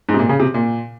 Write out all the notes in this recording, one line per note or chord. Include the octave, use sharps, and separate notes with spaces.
G#2
C3
A#2
C#3
C3
A#2